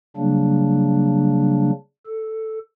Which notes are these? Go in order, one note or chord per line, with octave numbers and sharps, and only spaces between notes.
C#3 F#3 G3 A#3 D4
A4